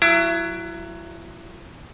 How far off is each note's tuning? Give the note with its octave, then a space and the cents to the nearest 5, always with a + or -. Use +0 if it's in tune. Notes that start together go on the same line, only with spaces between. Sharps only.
F#3 +0 E4 +30